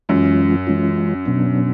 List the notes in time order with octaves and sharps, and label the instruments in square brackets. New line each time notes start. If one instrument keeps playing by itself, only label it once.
[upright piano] F#2 [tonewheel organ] E3 G#3 C#4 F4
[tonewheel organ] E3 G#3 C#4 F4
B2 F#3 B3 D4